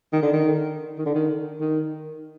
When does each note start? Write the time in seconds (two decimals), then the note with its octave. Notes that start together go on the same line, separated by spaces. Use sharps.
0.13 D#3
0.23 D3
0.33 D#3
0.98 D#3
1.06 D3
1.14 D#3
1.61 D#3